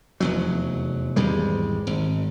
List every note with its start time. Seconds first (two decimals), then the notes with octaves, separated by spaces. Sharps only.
0.20 F1 E2 F#3
1.16 G#1 E2 G3 G#3
1.87 G#1